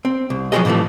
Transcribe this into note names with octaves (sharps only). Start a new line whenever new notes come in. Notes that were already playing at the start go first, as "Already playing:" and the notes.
C4
C2
F3 F#3 G#3 A3 G#4 D#5
A2 C3 E3 F3 A3